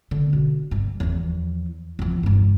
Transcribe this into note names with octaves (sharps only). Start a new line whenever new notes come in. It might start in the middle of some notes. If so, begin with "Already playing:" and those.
D3
B2
G2
E2 F3
E2 F3
C#2 G2